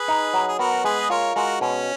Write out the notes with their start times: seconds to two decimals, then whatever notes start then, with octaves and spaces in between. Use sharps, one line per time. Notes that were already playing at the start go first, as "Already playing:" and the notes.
Already playing: G#4 B4
0.08 D#4
0.34 F#3
0.48 G#4
0.59 B3 F#4 A#4
0.84 G#3 G#4 B4
1.00 D#5
1.10 F4 A#4 C#5
1.35 G#3 F#4 A#4
1.61 B2 C#4